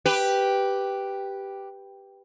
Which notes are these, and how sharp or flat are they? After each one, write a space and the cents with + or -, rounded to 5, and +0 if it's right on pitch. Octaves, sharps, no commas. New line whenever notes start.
G4 +0 B4 +0